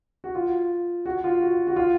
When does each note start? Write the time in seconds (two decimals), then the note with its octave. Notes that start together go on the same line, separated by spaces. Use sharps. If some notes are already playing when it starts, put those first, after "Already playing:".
0.24 F#4
0.35 F4
1.06 F#4
1.24 F4
1.41 F#4
1.67 F#4
1.76 F4